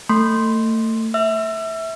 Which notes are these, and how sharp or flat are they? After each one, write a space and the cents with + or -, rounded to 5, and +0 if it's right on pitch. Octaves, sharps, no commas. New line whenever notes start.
A3 +30 C6 +0
E5 -15 E6 +40